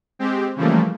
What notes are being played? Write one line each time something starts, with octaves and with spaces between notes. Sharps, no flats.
G#3 C4 G4
C#3 E3 F3 G3 A3 A#3